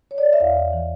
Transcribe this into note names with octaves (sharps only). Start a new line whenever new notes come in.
C#5
D5
D#5
E5
E2 F5
E2
E3